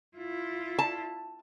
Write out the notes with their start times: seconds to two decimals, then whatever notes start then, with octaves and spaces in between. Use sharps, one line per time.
0.17 E4 F4
0.79 A5